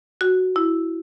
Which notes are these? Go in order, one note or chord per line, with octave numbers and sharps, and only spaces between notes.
F#4
E4